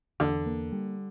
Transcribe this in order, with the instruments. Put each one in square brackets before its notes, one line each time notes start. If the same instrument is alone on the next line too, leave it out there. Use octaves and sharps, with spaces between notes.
[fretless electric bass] E2 [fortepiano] D3
[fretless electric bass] A#3
G3